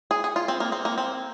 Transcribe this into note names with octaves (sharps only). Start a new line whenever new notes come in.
G#4
G#4
F4
C4
A#3
C4
A#3
C4